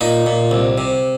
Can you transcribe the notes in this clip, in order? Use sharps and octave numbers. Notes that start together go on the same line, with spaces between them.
A#2 D#4
A#2
C2
C3